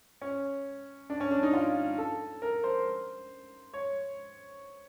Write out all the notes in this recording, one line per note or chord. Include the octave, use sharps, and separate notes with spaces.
C#4
D4
C#4
D4
D#4
F4
A4
A#4
C5
C#5